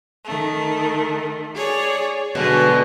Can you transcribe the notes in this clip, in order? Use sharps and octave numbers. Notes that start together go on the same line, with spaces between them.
D#3 A3
G#4 C#5 D5
B2 D3 F#3 G#3